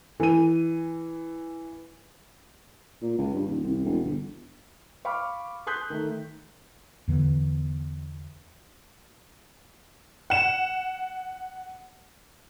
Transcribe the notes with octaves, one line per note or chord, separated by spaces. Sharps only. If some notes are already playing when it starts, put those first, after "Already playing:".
E3 D#7
A#2
C#2
G2
D#1
C2
E1
G1
F5 B5 C#6 D6 F6
C6 D#6 F#6 G6 B6
D#3 A3
E2 D3 E3 B3
F#5 E7